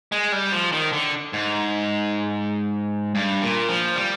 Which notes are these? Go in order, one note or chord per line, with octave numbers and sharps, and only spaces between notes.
G#3
G3
F3
D#3
D3
G#2
G2
A#2
F3
G3